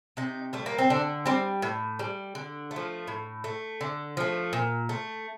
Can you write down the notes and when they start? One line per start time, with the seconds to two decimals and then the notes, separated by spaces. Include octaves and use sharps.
0.17 C3 D#4
0.53 G3 A3
0.66 A#3
0.78 C4
0.90 D3 D4
1.26 G3 C4
1.62 A2
1.99 G3
2.35 D3
2.71 A3
2.76 F3
3.08 A2
3.44 A3
3.81 D3
4.17 F3 A3
4.53 A#2
4.89 A3